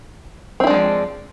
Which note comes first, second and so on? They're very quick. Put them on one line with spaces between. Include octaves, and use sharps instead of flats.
C4 E4 D4 G#3 F3